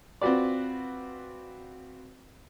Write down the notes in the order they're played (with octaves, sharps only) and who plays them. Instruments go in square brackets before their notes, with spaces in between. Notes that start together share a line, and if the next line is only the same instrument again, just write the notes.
[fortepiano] C4 F4 F#4 B4 D5